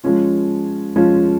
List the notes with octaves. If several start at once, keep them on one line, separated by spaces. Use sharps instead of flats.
F3 G#3 C#4 F4
F3 G#3 C#4 F4